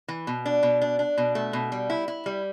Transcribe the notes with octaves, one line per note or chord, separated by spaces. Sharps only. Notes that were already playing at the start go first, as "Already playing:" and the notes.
E3
B2
D4
B2
D4
D4
B2
A3
B2
G3
E4
E4
G3